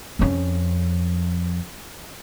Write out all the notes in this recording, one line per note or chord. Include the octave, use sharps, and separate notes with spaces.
F2 C#4